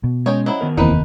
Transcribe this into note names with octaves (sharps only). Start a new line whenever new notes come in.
B2
G#3 C#4 C#5 D#5 G5
F#3 C4 E4
D#3 B3 A#4
F1 D#2 E3 A#3 C4 D#4 B4